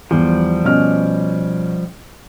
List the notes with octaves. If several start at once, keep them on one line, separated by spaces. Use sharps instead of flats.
E2 F3 G3
B2 C#4 F6